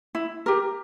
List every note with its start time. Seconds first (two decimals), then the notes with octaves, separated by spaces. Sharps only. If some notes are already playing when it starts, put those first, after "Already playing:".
0.15 E4
0.46 G4 A#4